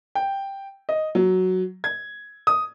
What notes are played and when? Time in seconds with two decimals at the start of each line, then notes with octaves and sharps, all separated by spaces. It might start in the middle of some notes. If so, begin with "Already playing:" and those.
0.15 G5
0.89 D#5
1.15 F#3
1.84 G#6
2.47 D#6